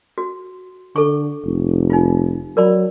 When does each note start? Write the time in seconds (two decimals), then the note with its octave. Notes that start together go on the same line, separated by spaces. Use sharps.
0.18 F#4
0.96 D3 A4 C#6
1.45 F1
1.90 D#4 F4
2.57 F#3 A#4 D5 B5